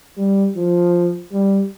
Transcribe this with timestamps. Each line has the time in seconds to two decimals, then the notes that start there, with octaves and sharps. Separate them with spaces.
0.17 G3
0.56 F3
1.32 G3